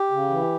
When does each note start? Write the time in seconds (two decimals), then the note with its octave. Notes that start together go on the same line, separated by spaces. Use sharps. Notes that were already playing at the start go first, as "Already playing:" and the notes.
Already playing: G4
0.11 C#3
0.30 E3